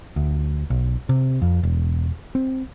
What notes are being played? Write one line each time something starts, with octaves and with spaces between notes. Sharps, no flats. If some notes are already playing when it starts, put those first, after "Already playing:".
D2
B1
C3
F2
E1
C4